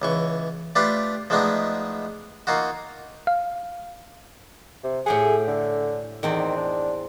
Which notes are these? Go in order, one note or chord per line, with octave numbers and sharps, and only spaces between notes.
C#2 E3 C#6
A3 D4 F4 G4 B4
F3 G#3 A3 B3 D4 D#4
A#3 D#4 F4 F#4
F5
C3
A2 G4 G#4 F#5
D3
E2 D#3 C4 D5
D4